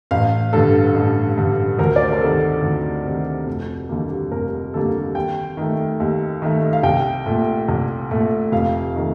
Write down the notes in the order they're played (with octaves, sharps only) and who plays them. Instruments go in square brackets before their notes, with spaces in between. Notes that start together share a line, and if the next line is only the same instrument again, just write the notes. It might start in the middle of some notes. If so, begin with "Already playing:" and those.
[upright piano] A1 F5
G2 D3 A4
A1
G2 D3
D2 A#4
D5
C5
A#4
C3 D#3 A4
D2
C3 D#3
F1
D#2 D3 G3 A#3
F1 A#4
D#2 D3 G3 A#3 A4
D#2 G5
D#3 A3
D#2
D#3 A3
F5
C2 G5
A#2 A3
C2
A#2 A3
F1 F5
D#3 A3